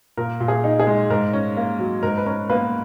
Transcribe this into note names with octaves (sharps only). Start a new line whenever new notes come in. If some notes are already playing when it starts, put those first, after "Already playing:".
A#2 A#4
A#2
G#4
D#4
G#4
G#3
G#2 A#4
C#4
A#3
F#3
G#2 A#4
B4
C#4 A#4
A#3 B3 B4